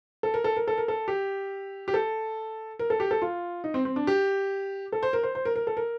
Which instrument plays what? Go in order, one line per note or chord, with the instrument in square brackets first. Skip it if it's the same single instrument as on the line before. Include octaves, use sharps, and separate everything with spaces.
[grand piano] A4
A#4
A4
A#4
A4
A#4
A4
G4
G4
A4
A#4
A4
G4
A4
F4
D#4
C4
C4
D4
G4
A4
C5
A#4
C5
C5
A#4
A#4
A4
A#4